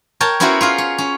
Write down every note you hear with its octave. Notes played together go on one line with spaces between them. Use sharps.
A#4 C#5 G5 A5
B3 C#4 E4 F#4 A#4 C5
F4 G#4 F5
C#5
C#4